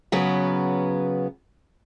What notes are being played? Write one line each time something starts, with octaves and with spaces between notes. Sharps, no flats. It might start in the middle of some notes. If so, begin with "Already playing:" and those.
C#3 F#3 B3 B4